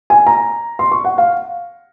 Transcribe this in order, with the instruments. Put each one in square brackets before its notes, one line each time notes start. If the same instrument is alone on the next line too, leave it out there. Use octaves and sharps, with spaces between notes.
[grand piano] G#5
A#5
C6
C#6
F#5
F5